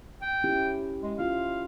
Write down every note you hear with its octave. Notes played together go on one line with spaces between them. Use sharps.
G5
C#4 E4 G4
G#3
C#4 E4 F4 F5